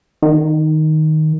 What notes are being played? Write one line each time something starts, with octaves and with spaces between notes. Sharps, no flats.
D#3